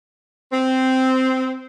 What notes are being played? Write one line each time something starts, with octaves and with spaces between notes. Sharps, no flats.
C4